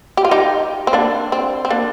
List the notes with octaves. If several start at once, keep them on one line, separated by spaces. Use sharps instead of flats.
G4
F4
D#4 G4
C4
A#3 D4
C4
C4
A#3 D4